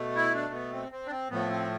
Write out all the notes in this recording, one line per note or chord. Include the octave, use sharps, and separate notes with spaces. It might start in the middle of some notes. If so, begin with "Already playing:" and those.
Already playing: B2 A3
E4
D4
B3
C4
C4
D4
C4
A2 F3 A3 B3
C4